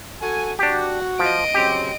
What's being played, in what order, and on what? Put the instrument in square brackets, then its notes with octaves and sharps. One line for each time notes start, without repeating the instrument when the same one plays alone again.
[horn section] F#4 A4 G#5
[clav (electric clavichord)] D4 G4 [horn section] F#4
[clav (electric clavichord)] F3 [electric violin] D#5 D7
[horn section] C#3 F#3 C4 [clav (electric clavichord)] G4